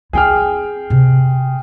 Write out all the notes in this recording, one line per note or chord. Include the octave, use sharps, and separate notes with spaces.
C4 E4 G#4 G5 F6
C3